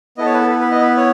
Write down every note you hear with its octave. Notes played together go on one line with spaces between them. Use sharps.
B3 E4 A4 D#5
C#5
B4
A4
B4
B4
D#5
B4
C#5